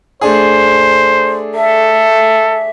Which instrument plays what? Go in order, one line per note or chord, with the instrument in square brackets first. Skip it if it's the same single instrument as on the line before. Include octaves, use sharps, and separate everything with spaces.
[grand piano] A3 D4 G#4 [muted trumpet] C5
[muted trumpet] A4 [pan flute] E5